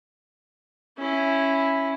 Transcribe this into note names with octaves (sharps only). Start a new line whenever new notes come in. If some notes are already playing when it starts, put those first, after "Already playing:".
C#4 E4